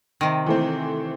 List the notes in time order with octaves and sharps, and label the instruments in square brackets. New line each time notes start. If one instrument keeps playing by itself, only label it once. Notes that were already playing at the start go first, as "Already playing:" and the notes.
[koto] C3 D#3
[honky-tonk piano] E3 A3 C4